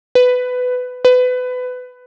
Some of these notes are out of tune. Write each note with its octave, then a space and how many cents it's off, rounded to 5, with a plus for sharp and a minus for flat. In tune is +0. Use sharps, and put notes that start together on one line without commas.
B4 +15
B4 +25